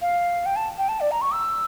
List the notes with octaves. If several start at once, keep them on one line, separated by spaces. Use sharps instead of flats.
F5
G5
A5
G5
A5
D5
A#5
C#6
E6